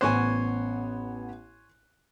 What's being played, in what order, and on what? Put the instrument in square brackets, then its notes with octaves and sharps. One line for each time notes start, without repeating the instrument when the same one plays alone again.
[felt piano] A1 B3 F#6 [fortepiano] C5 C#5 G#5